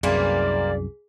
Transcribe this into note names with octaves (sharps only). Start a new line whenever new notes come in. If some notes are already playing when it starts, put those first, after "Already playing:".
C2 F#2 E3 A#3 C4 G#4 D5